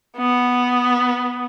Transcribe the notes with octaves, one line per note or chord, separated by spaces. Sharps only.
B3